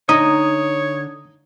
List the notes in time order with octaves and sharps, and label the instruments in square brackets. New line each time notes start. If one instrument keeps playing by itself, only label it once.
[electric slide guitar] D3 [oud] D#4 [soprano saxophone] C#5 [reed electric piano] D#6